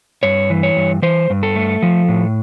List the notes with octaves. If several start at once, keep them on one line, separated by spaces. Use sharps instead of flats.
G2 C#5
E3
C#5
G2
E3 C5
G2
A4
A3
F3
A2